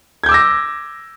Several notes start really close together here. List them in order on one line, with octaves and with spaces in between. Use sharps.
G#6 G6 D6 E6 A#6